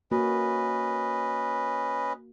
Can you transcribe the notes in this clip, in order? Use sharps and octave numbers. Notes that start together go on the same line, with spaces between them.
A#3 C#4 F#4 B4 D#5